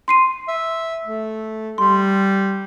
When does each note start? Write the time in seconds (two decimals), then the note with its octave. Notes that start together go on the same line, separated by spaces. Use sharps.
0.08 C6 C7 D#7
0.48 E5
1.05 A3
1.78 G3 C6